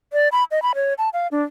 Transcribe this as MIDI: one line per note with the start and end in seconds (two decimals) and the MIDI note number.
0.13 0.28 74
0.32 0.44 83
0.51 0.62 75
0.62 0.72 83
0.75 0.94 73
0.98 1.09 81
1.13 1.28 77
1.31 1.42 62